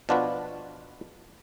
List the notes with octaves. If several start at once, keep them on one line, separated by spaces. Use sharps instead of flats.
B2 F3 D4 F4 F#4 B4